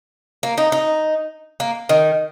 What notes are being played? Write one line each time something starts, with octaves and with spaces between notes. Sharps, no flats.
A#3
D#4
D#4
A#3
D#3